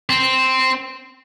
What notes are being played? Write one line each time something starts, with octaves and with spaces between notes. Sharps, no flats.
C4